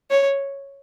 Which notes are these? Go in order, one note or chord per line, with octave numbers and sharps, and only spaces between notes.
C#5